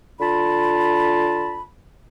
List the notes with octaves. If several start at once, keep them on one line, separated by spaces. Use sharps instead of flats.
D3 F4 A5 B5